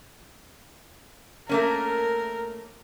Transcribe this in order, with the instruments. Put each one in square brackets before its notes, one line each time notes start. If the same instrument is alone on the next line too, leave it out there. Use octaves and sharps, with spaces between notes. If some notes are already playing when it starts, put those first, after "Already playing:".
[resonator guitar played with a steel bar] A3 A#3 C#4 [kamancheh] A#4